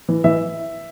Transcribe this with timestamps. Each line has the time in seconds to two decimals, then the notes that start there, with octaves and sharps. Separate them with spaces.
0.09 E3
0.24 E3 E5